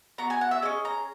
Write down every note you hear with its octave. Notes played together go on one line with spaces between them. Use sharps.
B3 F#4 A#5
G#5
F#5
E5
C#4 G#4 D#5
A#5